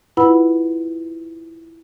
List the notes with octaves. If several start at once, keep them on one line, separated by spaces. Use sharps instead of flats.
E4 F4 B4 F#5 B5 E6